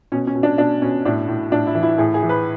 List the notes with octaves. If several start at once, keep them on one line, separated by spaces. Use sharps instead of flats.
B2 C#4
C#4
B2
D4
B2 D4
B2 C#4
A2 D4
A2
A2 D4
E4
E3
E4
A2 G#4
G#4
E3
B4